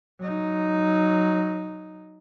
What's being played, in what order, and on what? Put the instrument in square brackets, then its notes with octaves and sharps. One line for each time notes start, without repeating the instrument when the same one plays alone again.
[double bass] F#3 D#4